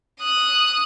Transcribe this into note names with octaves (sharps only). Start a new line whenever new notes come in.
D#6 F#6